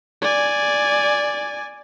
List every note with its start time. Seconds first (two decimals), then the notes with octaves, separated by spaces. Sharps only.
0.22 D5 G#5